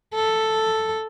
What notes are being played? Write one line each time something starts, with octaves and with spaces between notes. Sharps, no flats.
A4